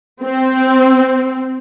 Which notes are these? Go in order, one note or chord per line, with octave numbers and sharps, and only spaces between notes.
C4